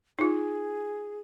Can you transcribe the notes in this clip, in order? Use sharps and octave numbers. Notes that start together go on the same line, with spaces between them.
D#4 F4 G#4